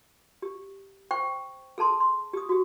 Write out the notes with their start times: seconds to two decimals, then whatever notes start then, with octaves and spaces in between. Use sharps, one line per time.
0.42 G4
1.11 C5 G5 C#6
1.78 G#4 A4 A5 C6
2.00 C6
2.33 G4 D#6
2.49 F#4 G4